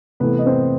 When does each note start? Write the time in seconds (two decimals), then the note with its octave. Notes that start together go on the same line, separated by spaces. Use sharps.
0.20 C3 E3 A3 B3 B4
0.39 D#5
0.46 C4 C5